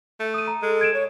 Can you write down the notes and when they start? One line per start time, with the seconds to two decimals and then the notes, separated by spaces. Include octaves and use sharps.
0.19 A3
0.34 D#6 D#7
0.48 A#5
0.62 G#3 A4
0.81 G#6 D7 E7
0.94 C#5